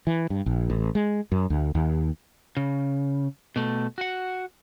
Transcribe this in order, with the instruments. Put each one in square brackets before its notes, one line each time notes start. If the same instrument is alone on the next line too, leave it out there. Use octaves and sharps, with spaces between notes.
[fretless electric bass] E3
G2
A#1
A1
G#3
F#2
D2
D#2
[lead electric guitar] C#3
B2 A3
F#4 F#5